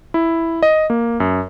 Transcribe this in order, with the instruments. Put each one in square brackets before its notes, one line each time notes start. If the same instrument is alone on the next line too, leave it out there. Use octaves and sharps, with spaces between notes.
[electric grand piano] E4
D#5
A#3
F#2